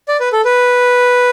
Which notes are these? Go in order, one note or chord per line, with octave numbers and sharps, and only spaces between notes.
D5
B4
A4
B4